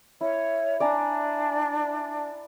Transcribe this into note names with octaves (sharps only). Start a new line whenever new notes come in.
E4 C#5
D4 D5 G#5 A#5